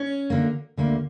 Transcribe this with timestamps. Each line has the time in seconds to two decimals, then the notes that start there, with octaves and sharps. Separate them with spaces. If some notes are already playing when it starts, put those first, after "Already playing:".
Already playing: C#4
0.30 D2 D3 A#3
0.77 D2 D3 A#3